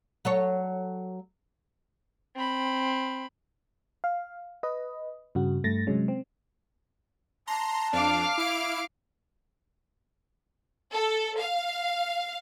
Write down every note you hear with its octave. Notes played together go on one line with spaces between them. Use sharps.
F#3 A4 C#5
C4 B5
F5
B4 D#5
G2 C#3 F#4
G2 A3 A6 A#6
C3 F#3 G#3 C#4
C4
A5 A#5 C6
F2 D4 F5 D6 F6
E4 D7
A4
F5